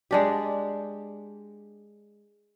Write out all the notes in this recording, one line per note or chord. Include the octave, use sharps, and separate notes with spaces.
G#3 D4 G4